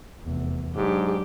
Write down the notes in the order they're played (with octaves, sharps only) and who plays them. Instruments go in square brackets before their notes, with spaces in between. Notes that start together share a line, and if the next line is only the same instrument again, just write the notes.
[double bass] F1 E2
[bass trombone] G#2 [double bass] F#3 D4 [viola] G4